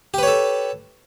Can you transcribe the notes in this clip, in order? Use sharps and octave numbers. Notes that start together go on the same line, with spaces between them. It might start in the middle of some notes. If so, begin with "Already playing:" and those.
G4 A4 B4 C#5